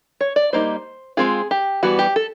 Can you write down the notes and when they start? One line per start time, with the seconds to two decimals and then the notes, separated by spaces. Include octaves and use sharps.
0.21 C#5
0.36 D5
0.53 G3 A#3 D#4 C5
1.17 G#3 C4 F4 G#4
1.51 G4
1.83 E3 G3 B3 F#4
1.99 G4
2.16 A4